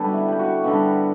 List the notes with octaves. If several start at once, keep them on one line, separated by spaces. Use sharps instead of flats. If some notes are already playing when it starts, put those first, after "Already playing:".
Already playing: D3 G3 B3 A4
F#4
E4
G4
F#4
D3 G3 B3